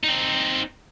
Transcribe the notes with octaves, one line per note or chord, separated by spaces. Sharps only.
C4 D#4